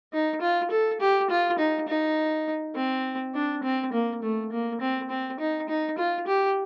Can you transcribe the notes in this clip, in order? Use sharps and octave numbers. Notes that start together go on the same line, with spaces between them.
D#4
F4
A4
G4
F4
D#4
D#4
C4
D4
C4
A#3
A3
A#3
C4
C4
D#4
D#4
F4
G4